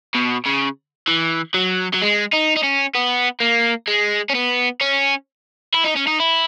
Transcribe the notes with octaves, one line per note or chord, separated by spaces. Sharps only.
B2
C#3
E3
F#3
F#3
G#3
D#4
D#4
C#4
B3
A#3
G#3
C#4
B3
C#4
E4
D#4
C#4
D#4
E4